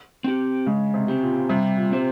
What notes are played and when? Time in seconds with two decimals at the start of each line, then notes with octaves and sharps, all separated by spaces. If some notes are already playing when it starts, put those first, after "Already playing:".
0.24 C4 G4
0.66 C#3 G#3
0.94 C3
1.08 C4 G4
1.22 A#2
1.49 C3 G3
1.77 A#2
1.92 C4 G4 C5